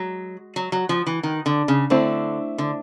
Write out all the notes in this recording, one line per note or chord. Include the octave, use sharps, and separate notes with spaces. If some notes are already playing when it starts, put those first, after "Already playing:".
Already playing: F#3 G#3
F#3
F#3
F3
E3
D#3
D3
C#3
D3 A3 C4 E4
D3